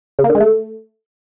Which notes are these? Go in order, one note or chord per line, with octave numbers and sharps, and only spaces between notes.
C#3
A#3
D3
G#3
A3